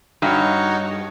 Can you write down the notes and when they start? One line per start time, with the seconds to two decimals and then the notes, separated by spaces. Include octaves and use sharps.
0.22 G2 D#4 F#4 C#5